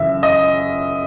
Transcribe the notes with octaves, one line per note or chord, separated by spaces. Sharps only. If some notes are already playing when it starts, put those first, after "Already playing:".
Already playing: F#2 C#3 E3 E5
D#5